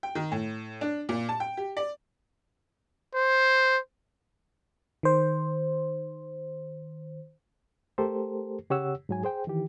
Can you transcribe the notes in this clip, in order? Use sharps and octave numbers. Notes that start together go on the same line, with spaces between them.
G5
D#3
A2
D4
A#2
A5
G5
G4
D5
C5
D#3 C5
A3 G4 A4 A#4 C5
C#3 G4 C#5 F#5 E6
G#2 F#3 G#5
G#4 C5 G5
D#3 E3 G4